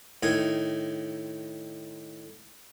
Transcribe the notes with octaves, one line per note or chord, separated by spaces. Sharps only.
A2 D#3 G#5 D#6